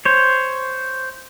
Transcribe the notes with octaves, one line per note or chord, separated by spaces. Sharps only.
C5 C#5